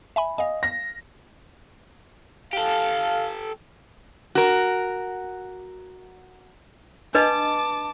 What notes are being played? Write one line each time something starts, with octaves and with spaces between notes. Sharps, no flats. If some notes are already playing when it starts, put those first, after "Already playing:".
E5 G#5 B5
D#5 F5 G#5
A#6
G4 A4 F5
F#4 A#4
D4 B4 D#5 A5 D6